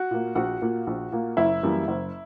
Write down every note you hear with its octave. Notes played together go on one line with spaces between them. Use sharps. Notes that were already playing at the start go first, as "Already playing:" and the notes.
Already playing: F#4
A#2 A#3
A#1 F#4 F#5
A#2 A#3
A#1
A#2 A#3
F#1 E4 E5
F#2 E3 G3 A#3
F#1